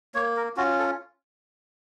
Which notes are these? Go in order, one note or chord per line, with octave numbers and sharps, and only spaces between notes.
A#3 C#5
A#4
C#4 F4 F#4
A4